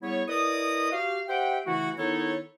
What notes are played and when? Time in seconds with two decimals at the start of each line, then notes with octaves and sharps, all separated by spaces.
0.02 G3 B3 E4 G#4 C#5
0.28 E4 A#4 B4 D5 D#5 D#6
0.92 F#4 G4 F5
1.28 G4 C5 E5 F#5 G5
1.66 C#3 E3 A3 E4 F#4
1.98 D#3 B3 D#4 E4 A4 C#5